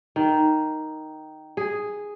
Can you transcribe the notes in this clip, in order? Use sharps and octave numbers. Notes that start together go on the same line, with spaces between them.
D#3
G#4